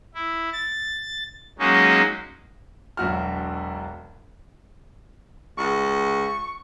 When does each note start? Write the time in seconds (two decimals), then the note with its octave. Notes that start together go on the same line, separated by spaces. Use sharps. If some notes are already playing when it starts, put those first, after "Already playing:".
0.14 E4
0.53 A6
1.59 F#3 G#3 A#3 C#4 D#4 F#4
2.97 E1 B1 F#4 F6
5.58 C#2 C#6